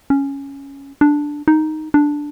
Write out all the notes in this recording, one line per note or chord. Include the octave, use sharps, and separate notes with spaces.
C#4
D4
D#4
D4